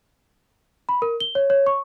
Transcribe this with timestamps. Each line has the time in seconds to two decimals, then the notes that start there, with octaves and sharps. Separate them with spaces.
0.89 B5
1.02 A#4
1.20 G7
1.35 C#5
1.50 C#5
1.67 C#6